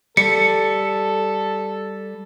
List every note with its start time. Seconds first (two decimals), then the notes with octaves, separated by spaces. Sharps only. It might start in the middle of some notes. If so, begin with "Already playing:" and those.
0.17 G3 A4 C#7